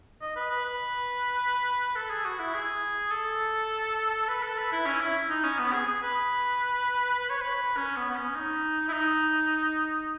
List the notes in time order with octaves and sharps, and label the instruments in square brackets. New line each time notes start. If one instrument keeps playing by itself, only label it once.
[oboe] D#5
B4
B4
B4
A4
G#4
F#4
E4
G#4
A4
B4
A4
B4
E4
C#4
E4
D#4
C#4
B3
G#4
G#4
B4
B4
C#5
B4
C#4
B3
B3
C#4
D#4
E4
D#4